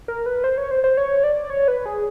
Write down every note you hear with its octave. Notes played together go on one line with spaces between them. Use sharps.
A#4
B4
C5
C#5
C5
C5
C#5
D5
C#5
B4
G#4